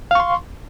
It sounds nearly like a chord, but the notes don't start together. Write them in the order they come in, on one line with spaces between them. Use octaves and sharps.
F5 C#6 C6